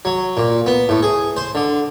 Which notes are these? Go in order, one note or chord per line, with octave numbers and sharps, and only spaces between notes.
F#3
A#2
B3
A2
G#4
C5
D3